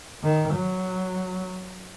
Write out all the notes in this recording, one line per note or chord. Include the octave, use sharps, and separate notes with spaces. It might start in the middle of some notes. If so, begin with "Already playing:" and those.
D#3
F#3